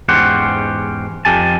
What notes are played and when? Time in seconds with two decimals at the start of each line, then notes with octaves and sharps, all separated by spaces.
0.09 E2 G#2 C#4 G4 C5 F#5
1.25 F2 G4 G#5 A5